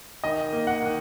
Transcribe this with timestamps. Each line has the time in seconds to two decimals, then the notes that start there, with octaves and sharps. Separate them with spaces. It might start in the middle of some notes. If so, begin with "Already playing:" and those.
0.24 D#3 D#5
0.53 A#3
0.67 F#5
0.82 D#3